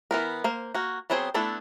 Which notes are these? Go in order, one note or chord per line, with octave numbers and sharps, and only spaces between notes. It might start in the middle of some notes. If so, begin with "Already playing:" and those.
E3 B3 A#4
A#3 C5
A#3 F#4
F#3 B3 C4 G#4 C5
A3 B3 D4 E4 A4